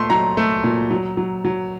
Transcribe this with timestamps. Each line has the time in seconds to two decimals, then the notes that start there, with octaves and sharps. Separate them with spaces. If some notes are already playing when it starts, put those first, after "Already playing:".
Already playing: A#2 A3 C6
0.10 F#3 A#5
0.37 A3
0.64 A#2
0.91 F#3
1.17 F#3
1.45 F#3